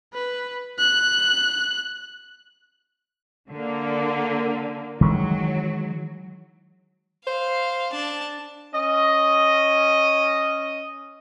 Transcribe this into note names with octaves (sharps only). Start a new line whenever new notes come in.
B4
F#6
D3 A#3
D#3 E3 F#3 G#3
C5 F5
D4 A5
C#4 D#5